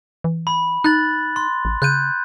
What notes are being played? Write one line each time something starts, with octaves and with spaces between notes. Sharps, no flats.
E3
B5
D#4 F#6 A6 F#7
C6
A1
C#3 F#6 G6 D#7